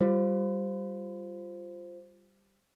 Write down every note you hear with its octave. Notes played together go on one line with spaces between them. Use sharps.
G3 F4 C5